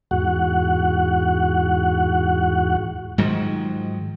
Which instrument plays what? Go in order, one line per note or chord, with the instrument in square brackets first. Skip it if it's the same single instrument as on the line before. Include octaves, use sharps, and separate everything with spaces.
[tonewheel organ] E2 G#2 F#4 F#5
[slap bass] G#2 D#3 F3 F#3